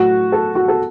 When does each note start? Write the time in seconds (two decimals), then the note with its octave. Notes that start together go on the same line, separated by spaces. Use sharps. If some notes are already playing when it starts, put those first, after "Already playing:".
Already playing: A2 F#3 F#4
0.32 A4
0.55 F#4
0.68 A4